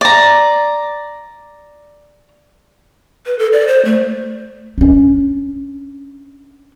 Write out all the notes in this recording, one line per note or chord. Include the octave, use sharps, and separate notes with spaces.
D5 A#5
B4
A4
D5
C5
A3
C#4 D4